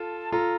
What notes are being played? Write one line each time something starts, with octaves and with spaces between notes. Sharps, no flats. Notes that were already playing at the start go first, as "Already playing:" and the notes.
Already playing: F4 A4 A5
F4 A4 A#5